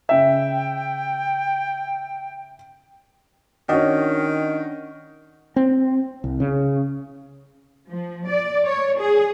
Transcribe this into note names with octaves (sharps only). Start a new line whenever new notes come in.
C#3 E5 G5
D#3 C#4 D4 F#4 D#5 G5
C4
C2
C#3
F3
D5
C#5
G#4